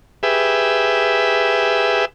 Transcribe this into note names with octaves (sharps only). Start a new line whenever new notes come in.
G4 G#4 B4 E5